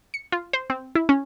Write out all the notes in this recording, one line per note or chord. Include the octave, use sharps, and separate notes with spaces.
C#7
F4
C5
C4
E4
C#4